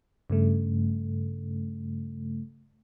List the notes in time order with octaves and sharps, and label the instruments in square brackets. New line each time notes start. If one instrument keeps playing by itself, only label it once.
[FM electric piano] G2 C#3 A3